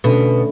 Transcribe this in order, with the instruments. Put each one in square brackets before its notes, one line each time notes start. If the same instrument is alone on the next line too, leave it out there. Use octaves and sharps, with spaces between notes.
[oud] B2 [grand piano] D3 A3 C#4